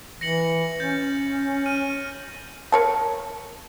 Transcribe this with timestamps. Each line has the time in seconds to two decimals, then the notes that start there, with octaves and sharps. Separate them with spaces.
0.21 E3 A#6 C#7 F#7
0.80 C#4 G6 A6
1.66 F6 D#7
2.72 A#4 C#5 A5